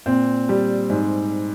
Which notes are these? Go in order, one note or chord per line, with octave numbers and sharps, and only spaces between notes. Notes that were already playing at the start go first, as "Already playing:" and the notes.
A#2 C4
G3
G#2